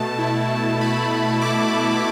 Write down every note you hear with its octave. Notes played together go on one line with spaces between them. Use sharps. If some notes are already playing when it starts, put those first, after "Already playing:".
Already playing: B2 A3 A5
E4
B2
A3 B5
B2
E4 D6
B2